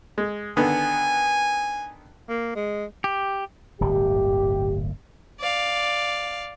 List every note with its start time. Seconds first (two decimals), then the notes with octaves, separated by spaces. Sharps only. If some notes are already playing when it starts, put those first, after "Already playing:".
0.18 G#3
0.57 D3 D#3 B3 G#5
2.29 A#3
2.56 G#3
3.04 G4
3.81 D1 G1 A#2 G4
5.40 D5 F5